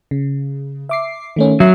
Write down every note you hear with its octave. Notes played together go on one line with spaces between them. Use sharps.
C#3
E5 D6 C7
D#3 A3 C#4
F#3 E5 F#6 C7